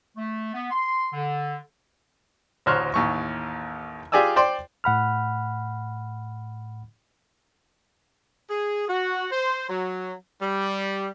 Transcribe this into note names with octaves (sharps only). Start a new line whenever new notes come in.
A3
B3
C6
D3
A1 D2 C5 C#5 F6 F#6
A1 D#2 C#6
F4 G4 G#4 D5 G#5 E6
C5 D5 G5 C6
A2 F#5 B5 F6
G#4
F#4
C5
F#3
G3